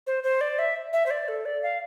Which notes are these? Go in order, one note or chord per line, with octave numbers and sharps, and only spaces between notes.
C5
C5
D5
E5
E5
C5
D5
A4
D5
F5